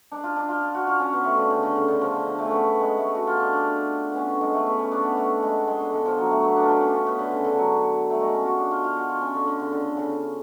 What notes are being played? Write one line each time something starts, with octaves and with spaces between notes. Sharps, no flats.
D4
F4
D4
F4
F4
F#4
F4
C#4
B3
A3
D3
C#3
D3
C#3
D3
F3
D3
D3
A3
C#4
B3
B3
G#3
A3
F#4
F4
D4
D4
B3 C#4
D3
G#3
A3
B3
C#4
D4
B3
A3
G#3
G#3
D3
D3
F3
F#3
A3
B3
D4
F4
D4
C#4
C#4
B3
D3
C#3
D3
F#3
A3
G#3
C#4
F4 F#4
D4
F4
F4
F#4
F4
C#4
D3
D3
C#3
D3
C#3